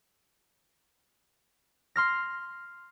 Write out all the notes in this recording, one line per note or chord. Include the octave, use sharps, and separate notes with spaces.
C6 F6 A#6